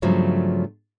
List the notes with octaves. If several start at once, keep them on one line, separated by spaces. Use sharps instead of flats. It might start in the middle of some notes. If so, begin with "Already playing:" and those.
G2 C#3 F3 F#3 A3 B3